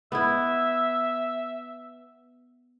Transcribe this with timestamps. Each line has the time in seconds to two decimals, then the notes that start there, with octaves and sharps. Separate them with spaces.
0.12 B3 E4 E5